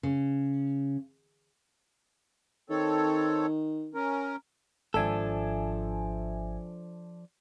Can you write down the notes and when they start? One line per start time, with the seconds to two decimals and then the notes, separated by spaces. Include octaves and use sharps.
0.03 C#3
2.70 D#3 C4 A4 C#5
3.94 C#4 A#4
4.94 G#1 F3 D4 A4 E5 G#5